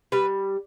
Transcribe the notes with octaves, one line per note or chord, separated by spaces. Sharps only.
G3 B4